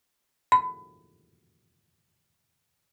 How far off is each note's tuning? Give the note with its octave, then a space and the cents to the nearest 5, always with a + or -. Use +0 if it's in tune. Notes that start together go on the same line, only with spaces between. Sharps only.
B5 +25